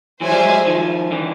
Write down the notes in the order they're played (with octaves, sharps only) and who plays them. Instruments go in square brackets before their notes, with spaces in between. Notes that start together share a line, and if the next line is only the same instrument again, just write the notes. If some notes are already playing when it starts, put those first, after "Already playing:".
[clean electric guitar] E3 F#3 [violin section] G#4 C5 E5 G#5
[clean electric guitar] F3 G3
F#3 G#3
D#3 F3
D3 E3